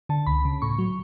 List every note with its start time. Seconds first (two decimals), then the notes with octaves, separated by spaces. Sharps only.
0.09 D3 A5
0.27 C#2 B5
0.45 C#3
0.62 A2 C#6
0.79 F#3